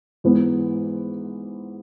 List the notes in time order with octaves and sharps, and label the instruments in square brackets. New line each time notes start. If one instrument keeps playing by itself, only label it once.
[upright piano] G#2 E3 B3